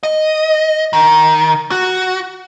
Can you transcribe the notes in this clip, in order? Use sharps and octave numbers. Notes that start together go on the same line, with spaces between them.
D#5
D#3
F#4